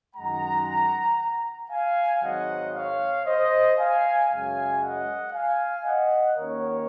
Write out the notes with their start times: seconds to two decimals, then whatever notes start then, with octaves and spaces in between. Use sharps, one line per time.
0.15 F#2 D#3 G#3 F#5 A#5
1.70 F5 G#5
2.22 G#2 D#3 F#3 C4 D#5 F#5
2.74 C#5 F5
3.26 C5 D#5
3.77 F5 G#5
4.29 F#2 C#3 G#3 F5 G#5
4.82 D#5 F#5
5.33 F5 G#5
5.84 D#5 F#5
6.36 D#2 D#3 A#3 C#4 A#4 C#5